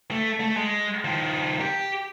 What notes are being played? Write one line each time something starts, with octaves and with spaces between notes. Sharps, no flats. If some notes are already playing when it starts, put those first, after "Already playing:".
A3
A3
G#3
D#3 F3
G4